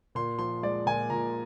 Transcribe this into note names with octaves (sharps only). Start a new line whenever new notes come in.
A#2 C6
F3 C6
G#3 D5
A#2 G#5
A#2 A#5